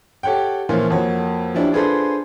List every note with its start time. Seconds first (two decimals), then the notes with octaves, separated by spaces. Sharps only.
0.23 G4 A4 C#5 F#5 G5
0.69 A#2 E3 F3 A#3 C#4 F4
0.90 F2 A#3 F#4 C#5
1.54 F3 C#4 D4 E4 G4
1.72 D4 F4 G#4 A4 B4 C5